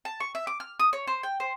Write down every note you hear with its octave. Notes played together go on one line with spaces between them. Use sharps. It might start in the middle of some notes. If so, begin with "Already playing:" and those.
A5
C#6
E5
D6
F6
D#6
C#5
C5
G5
C5